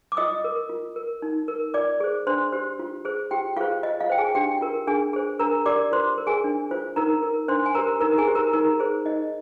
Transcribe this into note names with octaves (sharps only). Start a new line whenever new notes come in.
D6
F4 D#5 D#6
A#4
F4
A#4
D#4
A#4
F4 D5 D6
G#4 C5
D4 C5 C6
G4 C5
F4
G#4 C5
F4 G4 G5
F4 G#4 C5 F5
F4 D#5
F4 F5
C5 G5
G#4 G#5
D4 G4 G5
F4 A#4
D4 G#4 G#5
G#4 C5
D4 A#4 A#5
G4 A#4 D5 D6
F4 C5 C6
A#4
G#4 G#5
D4
F4 C5
D#4 A#4 A#5
A#4
D4 C5 C6
G#5
G4 A#4 C5 A#5
D#4 A#4 A#5
G#4 G#5
G4 C5
A#4 A#5
D#4 A#4 A#5
G#4 C5
D#4 D#5